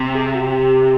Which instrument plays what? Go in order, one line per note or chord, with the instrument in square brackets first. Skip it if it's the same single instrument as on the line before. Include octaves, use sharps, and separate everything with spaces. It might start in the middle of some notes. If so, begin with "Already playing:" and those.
Already playing: [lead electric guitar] C3
[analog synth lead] G#4
F#4
G4